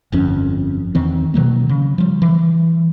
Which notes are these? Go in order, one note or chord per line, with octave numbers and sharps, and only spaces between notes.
G1 F2 C#4
E2 D#3 C4
B2 D#3 F#3 A#3
C#3
F3 G3
E3